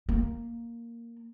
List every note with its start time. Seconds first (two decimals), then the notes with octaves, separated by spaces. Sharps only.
0.09 A#3